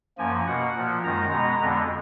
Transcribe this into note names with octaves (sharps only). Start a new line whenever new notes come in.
F#2 F3 A#3 G#5
B2 A#3 F#5
A#2 F3 A#3
F#2 D#3 G#3 A#5
B2 G#3 B3
F2 D3 G#3 B3